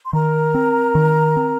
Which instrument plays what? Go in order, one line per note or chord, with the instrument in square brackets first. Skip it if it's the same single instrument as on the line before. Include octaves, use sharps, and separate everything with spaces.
[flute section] C6
[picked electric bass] D#3 [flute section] A#4 A#5
[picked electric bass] C4
D#3
C4